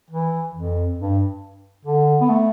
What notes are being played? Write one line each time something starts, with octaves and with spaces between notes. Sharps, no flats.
E3
F2
G2
D3
B3
A3